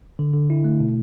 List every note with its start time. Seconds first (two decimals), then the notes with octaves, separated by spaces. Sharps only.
0.19 D3
0.33 D3
0.50 E4
0.64 A3
0.80 B2